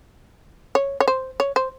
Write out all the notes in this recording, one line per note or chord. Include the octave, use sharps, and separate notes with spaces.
C#5
C#5
C5
C#5
C5